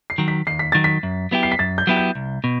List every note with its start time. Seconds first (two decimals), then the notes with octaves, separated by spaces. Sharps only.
0.10 C7
0.18 D#3 F#3
0.28 B6
0.47 D#2 C7
0.59 B6
0.72 D#3 F#3 A6
0.84 B6
1.03 F#2
1.31 F#3 B3 E4 G4
1.43 C7
1.52 B6
1.59 F#2 A6
1.78 G6
1.87 F#3 B3 E4 G4
1.97 G6
2.15 C2
2.44 B2